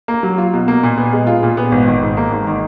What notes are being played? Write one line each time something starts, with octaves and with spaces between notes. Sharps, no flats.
A#3
F#3
F4
B2
A#3
A#2
B3
G#3
F4
A#2
B3
G#1
D#3
G#2
A#3
G#1
D#3